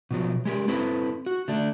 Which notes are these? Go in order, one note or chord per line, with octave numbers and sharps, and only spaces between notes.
B2 F3 F#3
G#3 G4 A#4
C4 E4 A4 B4 C5
F#4
D3 A3 D4